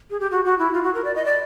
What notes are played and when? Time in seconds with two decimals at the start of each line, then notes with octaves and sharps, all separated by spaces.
0.10 G#4
0.20 G4
0.31 F#4
0.45 F#4
0.59 E4
0.73 F4
0.83 F#4
0.95 A#4
1.05 D5
1.16 D#5
1.25 D5